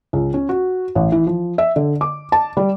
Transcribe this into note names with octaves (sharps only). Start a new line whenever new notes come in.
C#2
C#4
F#4
A1
E3
F3
E5
D3
D6
A5
G3